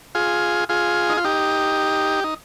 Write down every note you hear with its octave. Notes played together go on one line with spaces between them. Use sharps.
F4 G#4
F4 G#4
D#4
F4
D#4 G4
D#4